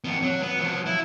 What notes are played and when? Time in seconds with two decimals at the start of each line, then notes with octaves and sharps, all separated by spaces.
0.04 F2 B3
0.22 F#3
0.42 B3 B4
0.61 F3 F#3
0.86 E4